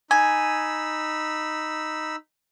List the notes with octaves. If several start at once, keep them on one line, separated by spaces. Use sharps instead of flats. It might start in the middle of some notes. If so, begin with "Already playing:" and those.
D#4 G#5 B5 E6